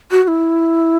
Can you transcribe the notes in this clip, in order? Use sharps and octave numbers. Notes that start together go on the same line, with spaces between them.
F#4
F#4
E4